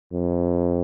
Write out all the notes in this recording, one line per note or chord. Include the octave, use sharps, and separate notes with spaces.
F2